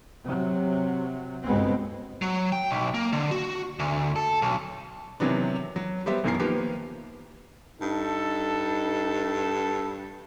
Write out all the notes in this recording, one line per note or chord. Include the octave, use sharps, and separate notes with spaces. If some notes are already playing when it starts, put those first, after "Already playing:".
C3 F#3
G1 C#2 B2 G#3 B3 C4
F#3
G5
B1
A#3
D3
F#4
D2
A4
B1
C3 D#3 E3 F#3 B3 D4
F#3
G3 B3 G4 C5 E5
B1 F#2 B2 E3 A#4 C7
D#3 F3 A#3 B3 G4 B4
G2 D#4 A4